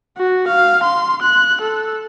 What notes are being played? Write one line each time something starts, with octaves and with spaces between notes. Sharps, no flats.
F#4
F5
C6
F#6
A4